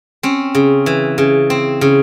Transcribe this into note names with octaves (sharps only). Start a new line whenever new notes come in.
C4 C#4
C#3
E3
C#3
C4
C#3